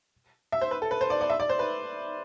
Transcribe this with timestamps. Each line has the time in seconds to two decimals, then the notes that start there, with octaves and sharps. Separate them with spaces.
0.52 E5
0.61 C5
0.71 B4
0.82 A4
0.91 B4
1.01 C5
1.10 D5
1.21 D5
1.30 E5
1.40 D5
1.49 C5
1.59 B4